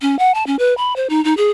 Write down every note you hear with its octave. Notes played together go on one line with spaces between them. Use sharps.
C#4
F#5
A5
C#4
B4
B5
C5
D#4
D#4
G#4